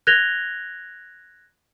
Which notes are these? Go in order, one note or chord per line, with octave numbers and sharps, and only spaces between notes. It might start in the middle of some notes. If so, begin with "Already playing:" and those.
F#6 G#6 A#6 F7 G7